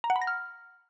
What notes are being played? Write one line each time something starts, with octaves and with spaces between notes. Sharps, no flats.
A#5
F#5
B5
A#6
F6